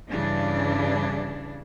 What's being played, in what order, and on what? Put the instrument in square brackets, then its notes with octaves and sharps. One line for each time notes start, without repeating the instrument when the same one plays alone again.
[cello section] G2 C#3 E3 D4